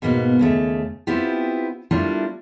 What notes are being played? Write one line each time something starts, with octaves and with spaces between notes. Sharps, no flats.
G#2 B2 A#3 B3
D#2 C#3 A3
B3 C4 E4 F4 G4
G3 A3 A#3 D4 E4 F4